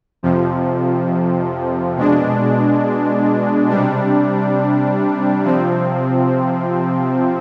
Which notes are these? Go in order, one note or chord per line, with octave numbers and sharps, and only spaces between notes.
F2 C3 F3
B2 G#3 D4
C3 G3 D4
C3 F3 C4